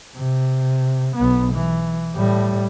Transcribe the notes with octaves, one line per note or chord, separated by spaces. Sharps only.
C3
B1 B3
E3
A2 G3